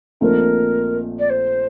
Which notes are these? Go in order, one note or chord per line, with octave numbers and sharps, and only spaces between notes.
A#1 A#2 A3 C4 D#4 A#4
D5
C5